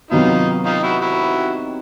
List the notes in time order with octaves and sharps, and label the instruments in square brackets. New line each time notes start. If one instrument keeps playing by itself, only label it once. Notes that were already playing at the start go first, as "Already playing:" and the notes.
[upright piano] C3 D#3 F#3 B3 [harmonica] D#4 F4
[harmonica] D#4 F4
E4 F#4
E4 F#4